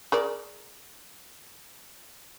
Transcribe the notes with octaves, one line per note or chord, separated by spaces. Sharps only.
G#4 A#4 D5